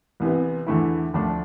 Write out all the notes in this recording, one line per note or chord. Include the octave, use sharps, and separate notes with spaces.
C2 C3 E3 B3
E2 D3 A3 E4
D2 D3 F3 A3 D4